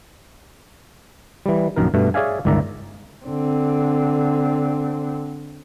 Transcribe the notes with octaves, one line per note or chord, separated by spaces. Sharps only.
E3 G3
A#1 F#2 D#3 A#4
G2 B2 A3
G#4 C#5 D5 E5 F5 G#5
G1 C#2 D#3 D5 E5 A#5
D3 C4